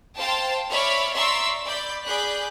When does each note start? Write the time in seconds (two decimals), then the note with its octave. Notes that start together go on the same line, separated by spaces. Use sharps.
0.18 C5 F5 G5 A5 C6 A6
0.71 C#5 D5 E5 B5 F6
1.15 D5 E5 A#5 C6 C#6 E6
1.66 D5 B5 G6
2.06 G#4 D5 B5 F#6 G6